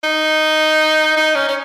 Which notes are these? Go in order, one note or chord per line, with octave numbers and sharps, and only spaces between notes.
D#4
D#4
C#4
C#4